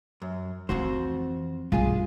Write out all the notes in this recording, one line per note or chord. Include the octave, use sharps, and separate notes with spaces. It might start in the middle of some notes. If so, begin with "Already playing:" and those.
F#2
F2 E3 C4 F#4 C5
B1 G2 F4 G#4